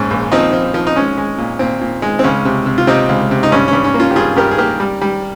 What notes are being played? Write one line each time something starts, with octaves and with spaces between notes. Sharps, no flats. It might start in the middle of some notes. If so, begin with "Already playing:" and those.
Already playing: A#1 G#2 C#4
A#1
F3 C4 D#4
F3
F3
D#4
G#3 C#4
G#3
A#2
A#2 C4
A#2
G#3
C4
C#2 C#4
C3
C3
F4
C3 C4 D#4
C#2
C3
D#4
G2 C#4
G2 C#4
C#4
A#3
C#4 F4
G4
G2 F4 G#4
G2 G4 A#4
G#4
A#3 G4 A#4
G3
G3